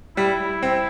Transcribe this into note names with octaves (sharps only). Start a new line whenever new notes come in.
G3 E4
C4